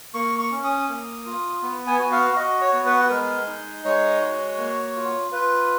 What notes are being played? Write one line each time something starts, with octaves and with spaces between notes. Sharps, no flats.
A#3 C#6
C#6
C#4
D#6
A#3
F4
B3
G#5
F#4
F5
F#4 D#5
C#5
B3
B4
G#3 A#4
D#4
G#3 C#5
F#4
A#3
F4
F4 B4